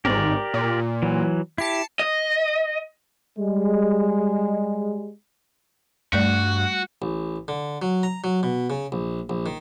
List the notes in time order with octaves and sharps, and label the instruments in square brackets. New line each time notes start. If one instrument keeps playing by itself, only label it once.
[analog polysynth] G#1 G#2 [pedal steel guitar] G4 A#4 D5
[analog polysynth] A#2
[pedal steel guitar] E3 F#3
[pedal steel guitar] E4 G4 [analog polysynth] A5 C7 C#7
[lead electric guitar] D#5
[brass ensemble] G3 G#3
[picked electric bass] G2 [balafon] G3 A3 D5 [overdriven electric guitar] F#4
[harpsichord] A1
D3
F#3
A#5
F#3
B2
C#3
A#1
A#1
D#3